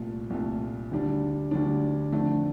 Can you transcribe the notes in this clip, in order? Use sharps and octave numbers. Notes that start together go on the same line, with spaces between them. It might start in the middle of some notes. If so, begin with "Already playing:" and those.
Already playing: C2 A#2 A3
C2 A#2 A3
D2 D3 G3 D4
D2 D3 G3 D4
F2 D3 A3 D4